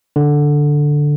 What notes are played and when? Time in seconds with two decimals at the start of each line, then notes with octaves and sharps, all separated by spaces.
0.16 D3